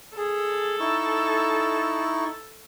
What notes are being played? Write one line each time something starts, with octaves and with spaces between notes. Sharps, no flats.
G#4 A4
D#4 E4 C#6